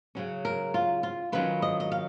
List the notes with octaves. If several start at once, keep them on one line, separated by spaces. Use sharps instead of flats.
C#3 F#3 C#4
A#4
F4
F4
D#3 F#3 C#4 F4 B4
D#5
D#5
F5